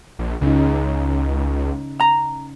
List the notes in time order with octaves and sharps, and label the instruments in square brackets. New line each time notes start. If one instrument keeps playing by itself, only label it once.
[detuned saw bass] A#1
[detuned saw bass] C#2 [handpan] C#3 C#4 D#4
[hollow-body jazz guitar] A#5